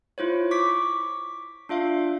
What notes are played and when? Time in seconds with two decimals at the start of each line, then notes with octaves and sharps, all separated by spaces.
0.18 E4 F4 C5 C#5
0.51 C#6 D6 B6
1.69 D4 F4 E5 F5